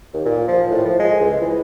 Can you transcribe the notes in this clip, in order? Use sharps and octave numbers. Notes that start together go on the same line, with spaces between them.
D#2
A#2
F3
A2
F3
G#3
C#2
E3